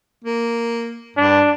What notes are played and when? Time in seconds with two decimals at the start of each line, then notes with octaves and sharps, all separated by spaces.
0.25 A#3
1.17 G2 D4